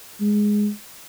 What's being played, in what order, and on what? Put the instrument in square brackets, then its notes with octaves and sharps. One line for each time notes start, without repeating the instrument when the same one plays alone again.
[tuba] G#3